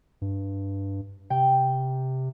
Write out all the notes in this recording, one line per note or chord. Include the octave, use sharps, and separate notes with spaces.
G2
C3 G5